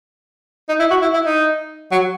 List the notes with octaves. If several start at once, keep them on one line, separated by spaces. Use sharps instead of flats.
D#4
E4
F#4
E4
E4
D#4
F#3